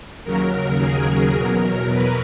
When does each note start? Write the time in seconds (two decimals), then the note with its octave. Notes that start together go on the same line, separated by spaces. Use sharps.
0.24 D#2 C#3 F#3 A#4
0.80 G#4
1.35 E2 B2 F#3 A#4
1.91 B4